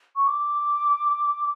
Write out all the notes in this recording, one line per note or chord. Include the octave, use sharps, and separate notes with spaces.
C#6
D6